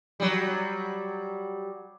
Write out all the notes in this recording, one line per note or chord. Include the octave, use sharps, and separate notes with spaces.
F#3 G3